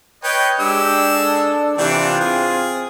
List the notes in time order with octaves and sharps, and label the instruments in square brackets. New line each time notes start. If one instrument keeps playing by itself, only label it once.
[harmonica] B4 C#5 D#5 [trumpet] G5
[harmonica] G#3 E6 [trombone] D4 [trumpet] G4
[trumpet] A4
[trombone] C3 [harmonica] E3 D4 G5 [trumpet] F4
[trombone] C4 [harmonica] G#4